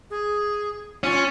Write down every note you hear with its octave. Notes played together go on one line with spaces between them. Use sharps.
G#4
C#4 F4